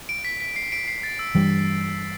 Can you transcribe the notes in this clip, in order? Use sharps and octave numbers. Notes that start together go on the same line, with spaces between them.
D7
B6
B6
C7
D7
C7
A6
E6
G2 E3 G3